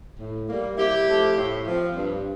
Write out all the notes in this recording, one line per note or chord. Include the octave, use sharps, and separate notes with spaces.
A2
G3 A#3
C3 E4 G4
F3 A3 C4
A2
F3 C4
G2